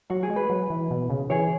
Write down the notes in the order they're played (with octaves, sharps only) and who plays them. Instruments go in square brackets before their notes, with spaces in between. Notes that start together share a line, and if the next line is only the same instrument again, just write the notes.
[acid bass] F#3 [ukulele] F#4
[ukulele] G#4
[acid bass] G#3
[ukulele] B4
[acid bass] F#3
E3
B2
C#3
[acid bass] E3 [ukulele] G#4 C#5